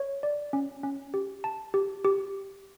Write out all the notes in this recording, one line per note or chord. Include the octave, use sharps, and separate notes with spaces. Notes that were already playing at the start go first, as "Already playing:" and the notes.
Already playing: C#5
D5
C#4
C#4
G4
A5
G4
G4